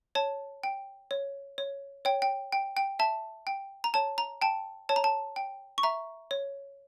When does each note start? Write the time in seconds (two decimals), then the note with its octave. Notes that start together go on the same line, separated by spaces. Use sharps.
0.15 C#5 A5
0.63 G5
1.11 C#5
1.58 C#5
2.05 C#5 G5
2.22 G5
2.52 G5
2.77 G5
2.99 E5 A5
3.47 G5
3.84 A#5
3.94 C#5 A5
4.18 A#5
4.42 G5 A5
4.89 C#5 A5
4.96 A#5
5.04 A5
5.36 G5
5.78 C#6
5.83 E5 A#5
6.31 C#5